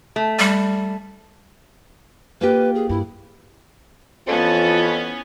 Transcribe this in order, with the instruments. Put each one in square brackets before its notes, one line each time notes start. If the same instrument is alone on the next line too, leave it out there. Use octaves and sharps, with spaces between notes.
[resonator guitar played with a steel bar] A3
[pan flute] G3
[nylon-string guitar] A#3 F4 G4 [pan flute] B4
[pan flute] G#4
[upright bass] G2 [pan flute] E4
[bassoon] F2 [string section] E3 B3 C#4 [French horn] F4 [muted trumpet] A5